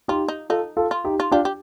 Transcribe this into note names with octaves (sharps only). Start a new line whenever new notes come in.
D#4 F4 G4
D#4
D#4 F4 A4
F4 A4
F4
D#4 G4
F4
D4 F4 G4
G4